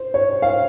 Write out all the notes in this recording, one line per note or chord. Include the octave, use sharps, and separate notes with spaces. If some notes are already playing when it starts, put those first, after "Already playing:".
Already playing: C5
C#5
F5